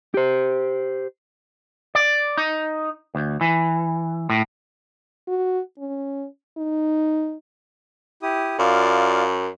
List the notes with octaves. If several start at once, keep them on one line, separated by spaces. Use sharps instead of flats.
G4 C5
D5
D#4
D2
E3
A2
F#4
C#4
D#4
E4 G4 D#6
F#2 F4 D5 F5